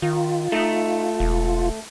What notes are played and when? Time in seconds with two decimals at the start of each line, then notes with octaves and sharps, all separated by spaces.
0.02 D#3 F4
0.52 A3 D#4
1.20 E1